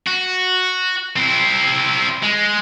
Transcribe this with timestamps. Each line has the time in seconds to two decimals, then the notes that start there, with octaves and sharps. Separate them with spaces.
0.07 F#4
1.16 C4 E4
2.23 G#3